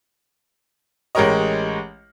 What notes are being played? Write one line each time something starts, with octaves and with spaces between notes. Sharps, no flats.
A1 G#3 G4 A#4 C#5 D#5